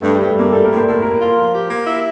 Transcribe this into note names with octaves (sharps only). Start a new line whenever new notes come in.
G2 A3
G2 G3
A3
G2 A#3
G3 A4
A2 A#4
C5
A2 A4
A#3 A#4
F4
F3
G4
A#3
E4